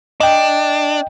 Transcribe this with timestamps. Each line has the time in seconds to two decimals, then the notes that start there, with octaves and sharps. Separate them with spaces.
0.20 D4 D#5 G5